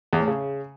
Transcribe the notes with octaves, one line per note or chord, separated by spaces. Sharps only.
E2
A2
C#3